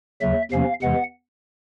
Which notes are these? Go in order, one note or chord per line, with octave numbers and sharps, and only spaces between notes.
D#2 C#3 F#3 E5
E2 C3 F3 A#3 C#4 F5
E2 C3 E3 G#3 F#5